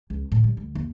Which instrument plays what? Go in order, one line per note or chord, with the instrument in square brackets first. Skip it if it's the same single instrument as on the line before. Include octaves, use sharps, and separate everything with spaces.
[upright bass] C#2
A2
G3
D2
D#2